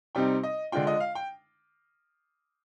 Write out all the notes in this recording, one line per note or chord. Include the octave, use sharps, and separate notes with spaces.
C3 G3 C4 D#4 G5
D#5
D3 G#3 D4 F4 G5
D#5
F5
G5